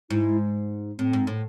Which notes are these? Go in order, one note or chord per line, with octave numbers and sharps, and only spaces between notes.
G#2 E4
A2 C4
G#2
A2